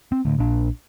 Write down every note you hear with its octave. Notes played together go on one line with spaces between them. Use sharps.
C4
D1 D2
A#1 D4